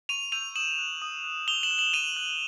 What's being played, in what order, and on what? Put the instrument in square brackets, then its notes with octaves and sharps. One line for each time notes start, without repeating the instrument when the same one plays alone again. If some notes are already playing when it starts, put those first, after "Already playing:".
[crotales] C#6 D#7 F7
E6 G6 D#7 F7
D#6 E7 F#7
F#6
D#6
F#6
D#6 F7 G7
E7 F#7
F#6
E7 F#7
D#6 D#7 F7
F#6